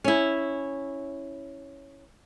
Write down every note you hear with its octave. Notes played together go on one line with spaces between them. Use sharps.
C#4 E4